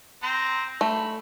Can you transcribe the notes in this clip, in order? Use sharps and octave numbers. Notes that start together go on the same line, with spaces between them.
C4 A#5 C6
A3 B5